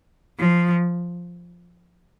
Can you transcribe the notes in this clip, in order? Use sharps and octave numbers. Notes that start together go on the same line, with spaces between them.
F3